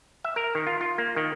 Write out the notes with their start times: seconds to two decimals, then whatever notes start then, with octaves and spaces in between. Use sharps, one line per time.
0.24 E5
0.36 A#4
0.55 D#3
0.67 F4
0.81 F4
0.98 A#3
1.16 D#3